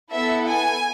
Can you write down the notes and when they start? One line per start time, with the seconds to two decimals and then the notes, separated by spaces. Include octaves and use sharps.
0.12 B3 E4 A4 E5
0.47 G#5